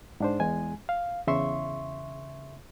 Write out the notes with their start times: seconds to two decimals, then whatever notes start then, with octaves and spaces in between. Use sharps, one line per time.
0.20 G#2 D4 C5
0.40 E2 G#3 G#5
0.89 F5
1.27 E2 C#3 E5 C6 C#6